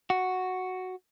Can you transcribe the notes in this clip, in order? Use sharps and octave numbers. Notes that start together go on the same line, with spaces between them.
F#4